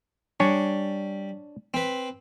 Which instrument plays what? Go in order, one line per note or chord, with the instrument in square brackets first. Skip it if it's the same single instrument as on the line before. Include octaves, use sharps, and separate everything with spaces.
[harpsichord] G3 [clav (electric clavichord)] D4 C#5 G#5
[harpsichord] C4 B4